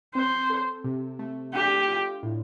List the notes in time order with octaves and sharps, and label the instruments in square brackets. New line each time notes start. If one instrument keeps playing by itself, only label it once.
[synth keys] C4 [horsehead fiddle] C5
[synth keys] A4
C3
A3
[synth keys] D4 [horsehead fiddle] G4
[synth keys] F4
A2